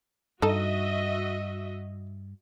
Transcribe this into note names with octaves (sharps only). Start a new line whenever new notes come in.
G2 D#4 F#4 A4 D#5 E5